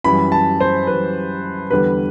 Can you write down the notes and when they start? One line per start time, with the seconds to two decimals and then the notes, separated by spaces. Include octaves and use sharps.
0.04 F#2 E3 G3 B5
0.32 A5
0.60 C5
0.87 F#2 E3 G3 B4
1.71 E2 D3 G3 B4